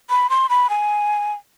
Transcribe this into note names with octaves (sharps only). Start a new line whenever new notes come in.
B5
C6
B5
G#5